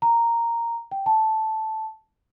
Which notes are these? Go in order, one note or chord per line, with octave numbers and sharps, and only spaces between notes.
A#5
G5
A5